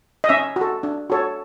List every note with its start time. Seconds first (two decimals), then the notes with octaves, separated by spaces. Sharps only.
0.24 D#5
0.29 C#4 E5
0.56 F#4 A4
0.83 D4
1.10 F#4 A4 C#5